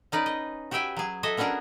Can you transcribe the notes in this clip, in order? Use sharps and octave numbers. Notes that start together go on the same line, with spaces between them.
C#4 D#4 B4 D5
D#5
F#4 G4 B4 E5 G5 G#5
F#3 G#4
F#4 A4 D#5 E5 G#5
B3 C#4 D4 F#4 G#4 A#4